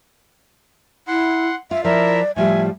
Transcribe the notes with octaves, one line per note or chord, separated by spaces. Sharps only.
E4 F#5 C6
F4 E5
F3 E4 A#4 D5 E5
A2 F3 G3 E5 G#5